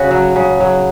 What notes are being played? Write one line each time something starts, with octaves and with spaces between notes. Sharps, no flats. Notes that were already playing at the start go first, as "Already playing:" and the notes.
Already playing: C#3 F#4
F#3
C#3
F#3